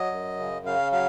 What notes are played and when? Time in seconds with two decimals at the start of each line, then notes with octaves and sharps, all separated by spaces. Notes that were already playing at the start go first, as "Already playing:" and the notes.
Already playing: F#3 D#5
0.12 F#2
0.39 C#3
0.66 C#3 F5
0.92 F#3 F5